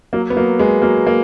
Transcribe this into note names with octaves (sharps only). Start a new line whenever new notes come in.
F#3 A#3
B3
F#3 A#3
G#3 B3
F#3 A#3
A#3